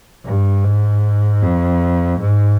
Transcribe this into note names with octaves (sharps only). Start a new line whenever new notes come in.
G2
G#2
F2
G#2